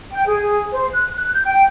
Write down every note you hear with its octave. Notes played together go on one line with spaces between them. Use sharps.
G5
G#4
C5
F#6
F#6
G6
G5